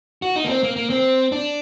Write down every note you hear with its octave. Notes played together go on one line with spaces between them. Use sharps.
F#4
D#4
A#3
C4
A#3
A#3
C4
D4